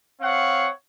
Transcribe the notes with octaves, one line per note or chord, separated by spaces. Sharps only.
C4 C#5 F5 F#5